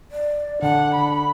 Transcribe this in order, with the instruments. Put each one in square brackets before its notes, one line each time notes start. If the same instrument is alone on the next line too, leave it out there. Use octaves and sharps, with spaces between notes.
[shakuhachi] D5
[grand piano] D3 [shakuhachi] D4 [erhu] F#5
[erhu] B5